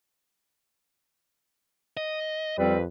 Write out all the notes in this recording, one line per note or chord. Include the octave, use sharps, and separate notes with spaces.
D#5
F2 G3 C4 B4